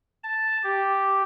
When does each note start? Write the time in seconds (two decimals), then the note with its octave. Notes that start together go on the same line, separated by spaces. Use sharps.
0.24 A5
0.64 G4